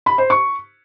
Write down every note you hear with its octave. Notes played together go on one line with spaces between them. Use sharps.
B5
C5
C#6